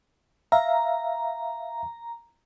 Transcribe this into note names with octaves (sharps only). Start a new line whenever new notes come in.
E5 F5 A#5